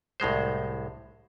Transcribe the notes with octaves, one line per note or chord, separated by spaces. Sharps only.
C2 A2 G#3 C5